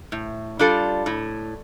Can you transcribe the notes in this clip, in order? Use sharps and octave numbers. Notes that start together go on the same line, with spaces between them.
A2
G3 D4 F4 A4
A2